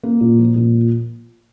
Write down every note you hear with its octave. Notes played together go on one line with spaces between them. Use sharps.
A#3
A#2
F3
A#2